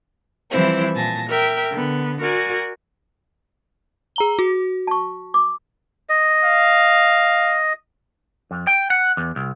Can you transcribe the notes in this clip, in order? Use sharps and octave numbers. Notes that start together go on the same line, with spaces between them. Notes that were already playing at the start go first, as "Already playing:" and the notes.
E3 F3 G3 C4 E4 C5
A#2 G#5 A5 A#6
A#4 E5 G5
D3 B3
F#4 A#4 D5 G#5
G#4 A#5 G7
F#4
A5 C#6
D6
D#5
F5
F2
G5
F#5
E2
C2